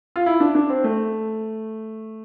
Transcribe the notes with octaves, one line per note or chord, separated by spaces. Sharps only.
F4
E4
D4
D4
C4
A3